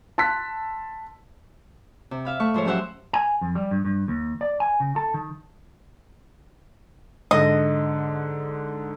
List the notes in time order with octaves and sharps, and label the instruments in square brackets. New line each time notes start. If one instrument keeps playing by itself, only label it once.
[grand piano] A5 C6 E6 F#6 B6
[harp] C3
E5 F5 B5
A3 E5 C#6
G#2 F3 C5 C#5
F#3 C#4 G4 C5 E5 F#5
[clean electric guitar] G#5
F2
G3
G2
G2
D#2
D5
G#5
C#3
A4
D#3
[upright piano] G#2 D3 [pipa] D#5